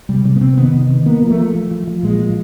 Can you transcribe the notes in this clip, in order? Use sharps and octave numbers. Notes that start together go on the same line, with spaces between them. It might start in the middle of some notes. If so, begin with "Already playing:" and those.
C3 G3
C3 G3
B3
C3 C4
D#3 B3
C3
D#3
A#3 B3
F3
A3
F3
F3
F3
F3
A#2 G#3
F3